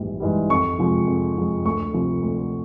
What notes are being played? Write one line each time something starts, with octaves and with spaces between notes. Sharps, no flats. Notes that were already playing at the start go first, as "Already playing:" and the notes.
Already playing: A#1 G#2 E3 G3
G#2 E3 G3
F2 C#6
C3 F3 G#3
F2
C3 F3 G#3
D2 C#6
C3 F3
D2